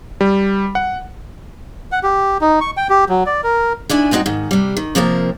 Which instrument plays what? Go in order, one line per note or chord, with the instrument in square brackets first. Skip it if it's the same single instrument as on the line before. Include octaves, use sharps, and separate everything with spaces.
[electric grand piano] G3
F#5
[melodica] F#5
G4
D#4
C#6
G5
G4
F#3
D5
A#4
[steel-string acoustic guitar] D#3 D4 E4 G#5
G3 G#3 C4 D#4 F#4
G#2 D#3
C3 G3
D#3
C3 F3 A#3 C4 A#4